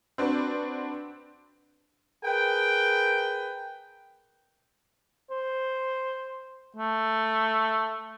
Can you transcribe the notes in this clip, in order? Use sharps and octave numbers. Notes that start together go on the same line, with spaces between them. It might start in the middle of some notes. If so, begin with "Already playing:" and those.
C4 D4 F#4 B4
G#4 A#4 B4 G5
C5
A3